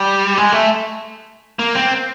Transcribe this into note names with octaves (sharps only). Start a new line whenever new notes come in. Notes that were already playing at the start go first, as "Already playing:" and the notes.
Already playing: G3
G#3
A3
A#3
C4